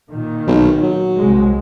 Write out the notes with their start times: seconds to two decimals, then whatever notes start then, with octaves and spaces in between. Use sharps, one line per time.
0.12 A#2 D#3
0.47 B1
0.82 F#3
1.18 C2 G#3